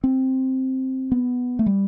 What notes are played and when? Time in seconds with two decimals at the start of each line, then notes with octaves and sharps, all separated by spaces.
0.04 C4
1.12 B3
1.59 A3
1.66 G3